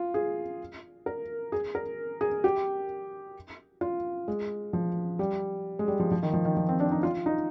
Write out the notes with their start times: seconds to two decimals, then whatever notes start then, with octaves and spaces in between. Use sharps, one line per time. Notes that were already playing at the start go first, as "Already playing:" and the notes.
Already playing: F4
0.14 G#4
1.06 A#4
1.52 G#4
1.75 A#4
2.21 G#4
2.44 G4
3.81 F4
4.28 G#3
4.73 F3
5.19 G3
5.79 G#3
5.88 G3
6.00 F3
6.11 F3
6.23 D#3
6.34 F3
6.45 D#3
6.57 F3
6.69 C4
6.80 D4
6.92 D#4
7.03 F4
7.26 D#4